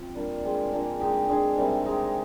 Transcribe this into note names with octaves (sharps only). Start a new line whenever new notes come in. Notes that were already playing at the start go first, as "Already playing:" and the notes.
Already playing: C4 F4
G3 A#3 D4
G#3 C4 G4
F3 A#3 D4
G#3 D#4 G4
G#3 D4 G#4
C3 D#3 G3 C4
G#3 D#4 G4